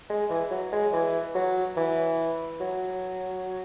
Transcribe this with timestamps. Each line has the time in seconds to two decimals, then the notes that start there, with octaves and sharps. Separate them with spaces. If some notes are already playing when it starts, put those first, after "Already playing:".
0.10 G#3
0.30 E3
0.51 F#3
0.72 G#3
0.93 E3
1.35 F#3
1.77 E3
2.60 F#3